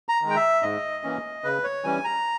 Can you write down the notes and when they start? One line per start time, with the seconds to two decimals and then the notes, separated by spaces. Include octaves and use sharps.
0.09 A#5
0.22 D#3 G#3
0.30 G5
0.36 E5
0.63 G#2 D#5
1.04 E3 A#3 C#4
1.44 C#3 B4
1.64 C#5
1.84 E3 G3 C#4 G#5
2.04 A#5